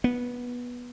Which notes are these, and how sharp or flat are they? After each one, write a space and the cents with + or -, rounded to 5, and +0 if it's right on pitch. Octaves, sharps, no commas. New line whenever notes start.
B3 -15